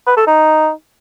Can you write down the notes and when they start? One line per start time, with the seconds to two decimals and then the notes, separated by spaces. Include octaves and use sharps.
0.07 B4
0.17 A4
0.27 D#4